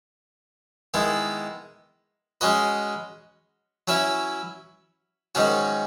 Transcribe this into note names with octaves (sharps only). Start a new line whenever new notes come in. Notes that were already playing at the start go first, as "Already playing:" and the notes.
D#3 G#3 B3 E4
G#3 C#4 F#4 B4 D#5
F#3 C#4 E4 B4 E5
G#2 D#3 F#3 C#4 F#4